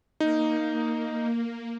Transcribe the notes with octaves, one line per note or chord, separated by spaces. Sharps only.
A#3 D#4